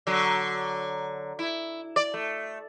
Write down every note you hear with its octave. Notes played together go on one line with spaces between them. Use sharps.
D3 F#3
E4
D5
A3